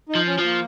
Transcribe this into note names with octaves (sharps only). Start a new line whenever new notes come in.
D#4
F3
C#4
F3
A#3